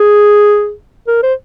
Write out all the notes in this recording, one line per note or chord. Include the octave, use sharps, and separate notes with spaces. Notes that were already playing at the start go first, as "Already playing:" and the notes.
Already playing: G#4
A#4
C5